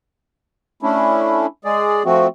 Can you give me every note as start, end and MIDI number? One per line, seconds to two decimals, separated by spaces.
0.83 1.46 57
0.83 1.46 61
0.83 1.46 62
0.83 1.46 64
1.65 2.03 56
1.65 2.03 68
1.65 2.03 74
2.05 2.27 53
2.05 2.27 57
2.05 2.27 60
2.05 2.27 66